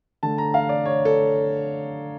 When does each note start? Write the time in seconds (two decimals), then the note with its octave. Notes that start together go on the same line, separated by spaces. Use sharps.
0.23 D3 A3 A5
0.38 A#5
0.54 F5
0.69 D5
0.85 C#5
1.05 A4